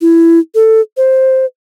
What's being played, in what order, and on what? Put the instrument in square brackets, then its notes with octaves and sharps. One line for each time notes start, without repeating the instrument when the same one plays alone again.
[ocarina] E4
A4
C5